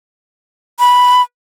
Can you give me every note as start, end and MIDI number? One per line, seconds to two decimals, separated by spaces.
0.79 1.22 83